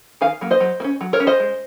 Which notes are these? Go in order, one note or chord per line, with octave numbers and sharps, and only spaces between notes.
D#3 F5 G#5
F#3 A#3
C5 D#5
F#3
A#3
C#4
F#3
A#4 C#5
C#4
C5 D#5
G#3